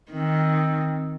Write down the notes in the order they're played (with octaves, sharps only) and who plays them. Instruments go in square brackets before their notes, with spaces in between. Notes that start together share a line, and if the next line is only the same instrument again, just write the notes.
[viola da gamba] D#3 [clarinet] C4